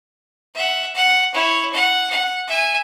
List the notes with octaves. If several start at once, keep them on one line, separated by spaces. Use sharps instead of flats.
E5 F#5
F#5
E4 C#5
F#5
F#5
E5 G#5